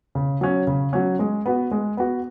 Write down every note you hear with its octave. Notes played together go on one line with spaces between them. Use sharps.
C#3
F#3 C#4
C#3
F#3 C#4
G#3
B3 F#4
G#3
B3 F#4